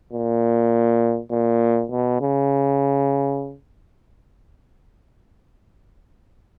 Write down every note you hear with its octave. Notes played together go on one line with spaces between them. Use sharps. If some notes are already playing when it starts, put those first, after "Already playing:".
A#2
A#2
B2
C#3